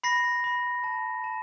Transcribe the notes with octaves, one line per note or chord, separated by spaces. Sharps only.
B5 A#6 C7
B5
A5
A5